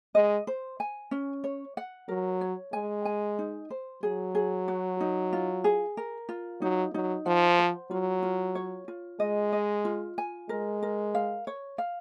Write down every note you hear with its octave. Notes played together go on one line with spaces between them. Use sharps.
G#3 D#5
C5
G#5
C#4
C#5
F#5
F#3 A#4
C#5
G#3 G#5
G#5
D#4
C5
F#3 G#4
G#4
F#4
D#4
F4
G#4
A#4
F4
F#3 D#4
F#3 D#4
F3 F#5
C5
F#3 F4
F4
C#5
F4
G#3 D#5
D#5
F4
G#5
G#3 A#4
A#4
F5
C#5
F5